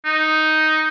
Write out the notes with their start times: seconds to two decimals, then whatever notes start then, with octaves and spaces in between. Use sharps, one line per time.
0.05 D#4